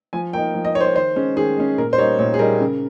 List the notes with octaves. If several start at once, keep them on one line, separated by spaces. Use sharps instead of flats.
F3 G#5
A#3 D#4 G5
F3
D#5
A#3 D#4 C5 C#5
C#5
D#3 C5
G#3 C#4
D#3 G#4
G#3 C#4
A#2 A#4
C5
G3 A#3 D#4 C#5
A#2 C#5
G#4
G3 A#3 D#4 A#4
C#3